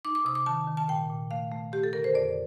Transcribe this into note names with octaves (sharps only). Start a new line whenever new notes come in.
D#4 D6
D6
C3 D#6
D6
D#3 A5
D#3
A5
A#2 G5
A#2
A3 F5
A3
A3 G4
A4
D3 A#4
C5
F2 D5